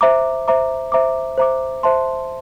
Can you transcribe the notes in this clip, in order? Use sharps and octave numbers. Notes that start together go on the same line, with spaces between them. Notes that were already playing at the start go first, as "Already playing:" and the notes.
C5 E5 A#5 D6
C5 E5 A#5 D6
C5 E5 A#5 D6
C5 E5 A#5 D6
C5 E5 A5 C6